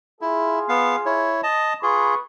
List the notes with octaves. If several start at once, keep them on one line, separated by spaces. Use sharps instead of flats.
E4 F4 G#4
B3 F5
E4 C#5
D#5 A5
F4 G#4 B4 B5 C#6